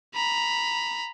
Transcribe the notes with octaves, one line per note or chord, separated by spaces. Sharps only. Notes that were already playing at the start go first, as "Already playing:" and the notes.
A#5 B5